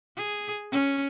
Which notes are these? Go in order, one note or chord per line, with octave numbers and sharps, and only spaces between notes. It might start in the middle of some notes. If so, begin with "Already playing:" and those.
G#4
C#4